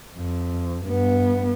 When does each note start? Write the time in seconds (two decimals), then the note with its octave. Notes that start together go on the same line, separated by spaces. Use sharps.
0.16 F2
0.85 G2 B3